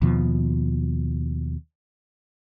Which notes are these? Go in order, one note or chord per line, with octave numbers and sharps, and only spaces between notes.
D#2 B2 F3